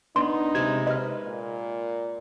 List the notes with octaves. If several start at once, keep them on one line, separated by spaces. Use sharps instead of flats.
B3 D4 D#4 C6
C3 G#3 D5 G#6
B4 D#5 F6
A#2